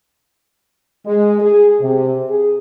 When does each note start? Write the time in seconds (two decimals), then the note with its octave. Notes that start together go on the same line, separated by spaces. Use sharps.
1.06 G#3
1.40 G#4
1.80 C3
2.30 G#4